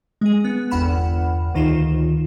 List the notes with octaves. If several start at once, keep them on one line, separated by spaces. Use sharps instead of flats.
G#3 G#4
B3
G1 E2 F#5 B5 F6 E7
D2 D#3 D#4 F4 E7